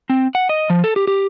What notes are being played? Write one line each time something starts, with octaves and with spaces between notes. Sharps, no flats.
C4
F#5
D#5
F3
A4
G4
G4